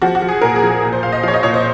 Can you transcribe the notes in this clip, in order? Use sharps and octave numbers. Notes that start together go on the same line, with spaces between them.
F3 F#4
F#4
F3
G#4
A#2 A#4
G#4
F3
G#4
A#2
C5
A#2 F5
D#5
F3 C#5 F5
D#5
A#2 C#5
C5